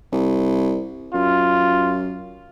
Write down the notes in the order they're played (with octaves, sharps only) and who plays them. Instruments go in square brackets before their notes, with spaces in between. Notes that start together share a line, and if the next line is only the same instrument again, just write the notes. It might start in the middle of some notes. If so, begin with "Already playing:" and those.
[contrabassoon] C2
[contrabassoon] F#2 [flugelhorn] F4